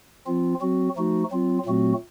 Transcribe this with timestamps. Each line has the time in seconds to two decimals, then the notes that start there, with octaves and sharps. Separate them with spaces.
0.27 F3 C4 F4
0.61 F#3 C4 F#4
0.96 F3 A3 D#4 F#4
1.31 F#3 C4 F4
1.66 A#2 F#3 A3 C4 F#4